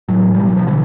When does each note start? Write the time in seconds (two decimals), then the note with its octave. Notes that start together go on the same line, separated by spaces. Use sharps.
0.09 A2 E3 F#3
0.35 B2 G3
0.45 F#3
0.56 F3
0.66 B2 D3 E3